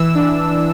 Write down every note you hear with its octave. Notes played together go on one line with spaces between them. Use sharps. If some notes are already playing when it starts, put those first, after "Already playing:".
Already playing: E3 E6
D4